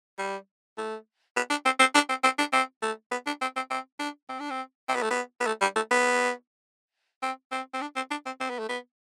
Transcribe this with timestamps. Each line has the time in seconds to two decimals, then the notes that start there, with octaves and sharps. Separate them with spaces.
0.18 G3
0.77 A3
1.36 B3
1.50 D4
1.65 C4
1.79 C4
1.94 D4
2.09 C4
2.23 C4
2.38 D4
2.52 C4
2.82 A3
3.11 B3
3.26 D4
3.41 C4
3.56 C4
3.70 C4
3.99 D4
4.29 C4
4.40 D4
4.50 C4
4.88 C4
4.95 B3
5.02 A3
5.10 B3
5.40 B3
5.47 A3
5.61 G3
5.75 A3
5.91 B3
7.22 C4
7.52 C4
7.73 C4
7.81 D4
7.96 C4
8.11 D4
8.26 C4
8.40 C4
8.50 B3
8.59 A3
8.69 B3